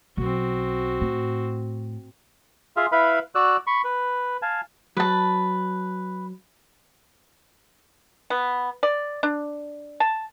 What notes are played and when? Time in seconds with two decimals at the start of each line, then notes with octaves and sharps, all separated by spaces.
0.17 B1 C4 F#4
1.01 A2
2.77 F4 G#4 E5 F5
2.92 E4 B4 E5 F5 B5
3.35 F#4 D5 E6 F#6
3.67 B5 C#6
3.84 B4
4.42 F5 G#5 A5
4.97 F#3 B4 A5
8.30 B3
8.83 D5
9.23 D4
10.00 A5